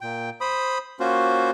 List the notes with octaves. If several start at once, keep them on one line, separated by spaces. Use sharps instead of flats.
A#2 G5
C5 B5 D#6
A#3 C#4 F4 F#4 C5